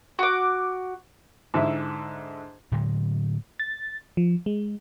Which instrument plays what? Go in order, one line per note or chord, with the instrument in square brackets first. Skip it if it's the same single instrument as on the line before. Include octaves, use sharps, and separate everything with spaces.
[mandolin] F#4 D6
[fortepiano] G#2 D3 E4 E5
[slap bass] A2 D3 F#3 G#3
[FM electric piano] A6
F3
G#3